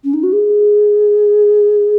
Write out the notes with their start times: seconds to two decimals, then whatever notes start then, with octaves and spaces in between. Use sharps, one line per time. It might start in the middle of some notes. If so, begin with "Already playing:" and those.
0.04 C#4
0.13 D#4
0.23 F#4
0.32 G#4